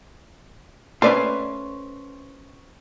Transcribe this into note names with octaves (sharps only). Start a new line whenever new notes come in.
A3 C#4 B4 C5 D5